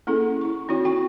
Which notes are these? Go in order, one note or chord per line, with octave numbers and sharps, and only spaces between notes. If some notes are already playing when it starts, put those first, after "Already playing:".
A#3 C#4 E4 G#4 A4
E4 C#6
C4 D#4 E4 F#4 C#5
F#4 G5 C#6